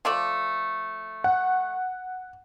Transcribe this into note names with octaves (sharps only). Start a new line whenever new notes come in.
F3 A3 D5
F#5